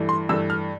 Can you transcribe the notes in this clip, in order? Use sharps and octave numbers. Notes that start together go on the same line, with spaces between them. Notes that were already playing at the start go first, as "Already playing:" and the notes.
Already playing: G2 E3 A3
C6
G2 E3 A3 E6
F6